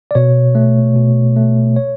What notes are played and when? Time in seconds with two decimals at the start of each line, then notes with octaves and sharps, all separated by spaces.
0.11 D5
0.15 B2 C#5
0.55 A3
0.96 B2
1.37 A3
1.76 C#5